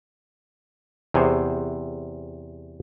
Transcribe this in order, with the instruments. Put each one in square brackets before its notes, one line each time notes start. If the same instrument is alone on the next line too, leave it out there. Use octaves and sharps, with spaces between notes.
[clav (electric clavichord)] E2 C3 G#4 C5 C#5